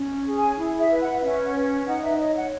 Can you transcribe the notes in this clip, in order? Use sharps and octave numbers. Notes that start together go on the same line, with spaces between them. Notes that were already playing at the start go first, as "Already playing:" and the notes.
Already playing: C#4
G#4
G#5
E4
E5
B4
F#5
C#4 E5
F#5
B4
D#4 F#5
E5
C#5 D#5
F#5